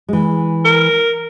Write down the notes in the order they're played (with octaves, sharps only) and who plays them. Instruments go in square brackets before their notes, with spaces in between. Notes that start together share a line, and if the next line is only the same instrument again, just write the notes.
[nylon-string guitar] E3 G#3
[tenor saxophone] A#4